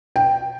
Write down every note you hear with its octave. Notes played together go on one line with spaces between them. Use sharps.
G5